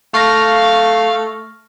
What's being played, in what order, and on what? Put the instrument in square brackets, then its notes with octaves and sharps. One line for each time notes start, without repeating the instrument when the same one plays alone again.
[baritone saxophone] A3 [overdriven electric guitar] F5 [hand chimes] C#6 F6 A#6